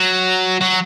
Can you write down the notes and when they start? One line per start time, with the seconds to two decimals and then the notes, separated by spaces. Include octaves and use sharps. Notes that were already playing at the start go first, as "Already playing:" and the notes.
Already playing: F#3
0.61 F#3